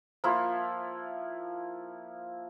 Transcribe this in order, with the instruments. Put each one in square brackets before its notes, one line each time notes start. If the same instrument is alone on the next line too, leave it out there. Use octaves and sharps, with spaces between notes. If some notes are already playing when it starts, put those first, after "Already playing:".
[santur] F3 A#3 E4 F4